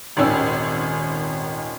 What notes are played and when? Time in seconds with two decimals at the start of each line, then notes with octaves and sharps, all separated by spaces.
0.16 D#1 G#1 D#3 C#4 E6